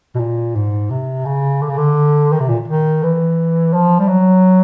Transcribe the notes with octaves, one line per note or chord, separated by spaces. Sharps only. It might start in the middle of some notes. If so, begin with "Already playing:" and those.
B2
A#2
G#2
C3
C#3
D3
C#3
D3
D#3
C3
A#2
D#3
E3
F3
G3
F#3